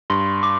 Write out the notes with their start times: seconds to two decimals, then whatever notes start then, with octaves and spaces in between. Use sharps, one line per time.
0.10 G2 C6
0.43 D6